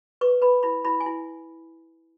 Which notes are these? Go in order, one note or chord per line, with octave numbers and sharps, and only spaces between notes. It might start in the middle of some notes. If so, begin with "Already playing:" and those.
B4 C#6
B4 B5
E4 B5
E4 B5
G#5
E4